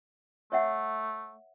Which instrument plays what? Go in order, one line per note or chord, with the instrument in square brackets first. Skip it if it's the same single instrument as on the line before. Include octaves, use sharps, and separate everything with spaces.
[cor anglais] A3 [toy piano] C#5 E5 F#5